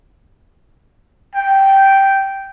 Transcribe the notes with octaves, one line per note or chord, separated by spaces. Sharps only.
G5